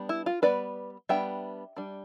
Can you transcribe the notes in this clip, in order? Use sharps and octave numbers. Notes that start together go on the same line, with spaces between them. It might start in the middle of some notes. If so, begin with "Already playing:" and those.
Already playing: G3 B3 D4
E4
F4
G3 B3 D4 B4 D5
G3 B3 D4 E5 G5
G3 D4